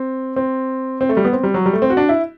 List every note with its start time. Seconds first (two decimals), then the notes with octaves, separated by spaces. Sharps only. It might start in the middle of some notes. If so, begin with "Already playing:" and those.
Already playing: C4
0.36 C4
1.01 C4
1.09 A3
1.17 G3
1.25 B3
1.33 C4
1.43 G3
1.54 F#3
1.66 G3
1.73 A3
1.82 C4
1.90 F#4
1.97 D4
2.09 E4